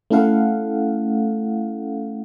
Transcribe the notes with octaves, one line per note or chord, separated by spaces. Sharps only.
A3 C#4 E4 A4 F5 F#5